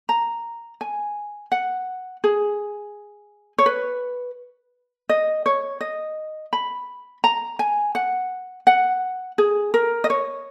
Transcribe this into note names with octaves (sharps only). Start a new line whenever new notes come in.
A#5
G#5
F#5
G#4
C#5
B4
D#5
C#5
D#5
B5
A#5
G#5
F#5
F#5
G#4
A#4
D#5
C#5